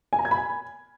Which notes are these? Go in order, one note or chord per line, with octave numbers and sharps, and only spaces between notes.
G#5
A#5
G#6
B5
G#5